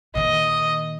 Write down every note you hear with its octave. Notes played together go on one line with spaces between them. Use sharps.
A#2 D#3 D#5